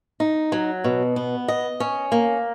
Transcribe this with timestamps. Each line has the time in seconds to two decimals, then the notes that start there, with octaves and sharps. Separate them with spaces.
0.20 D#4
0.52 F#3
0.84 B2
1.16 B3
1.48 D#5
1.80 C#4
2.12 A#3